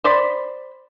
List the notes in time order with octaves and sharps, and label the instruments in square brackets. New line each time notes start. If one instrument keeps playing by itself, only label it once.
[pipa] C5 D5 B5